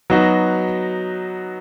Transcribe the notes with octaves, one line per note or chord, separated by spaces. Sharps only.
F#3 B3 D#4 F#4